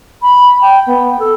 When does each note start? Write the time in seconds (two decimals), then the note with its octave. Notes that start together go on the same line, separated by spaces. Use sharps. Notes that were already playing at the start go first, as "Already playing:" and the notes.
0.22 B5
0.61 G5
0.87 B3
1.19 A4